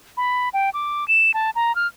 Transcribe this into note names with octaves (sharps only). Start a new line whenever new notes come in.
B5
G5
D6
E7
A5
A#5
F6